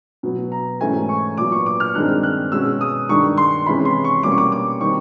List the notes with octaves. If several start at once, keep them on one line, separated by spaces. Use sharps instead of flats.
B2 F#3 B3
A#5
G#2 E3 A3 C#4 G#5
C#6
A#2 F#3 B3 D6
C#6
D6
F6
G2 D#3 G#3 C4 F#6
F#6
B2 G#3 C#4 E6
D#6
G2 D#3 G#3 C#6
C6
C3 E3 G#3 C#4 B5
C6
C#6
B2 G3 A#3 C#4 D6
C#6
D6
D6
D#3 G3 C4 C#6